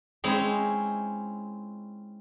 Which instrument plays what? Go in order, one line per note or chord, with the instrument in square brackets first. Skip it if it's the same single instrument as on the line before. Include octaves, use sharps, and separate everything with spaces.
[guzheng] G#3 C4 C#4 D#4 E4 G#4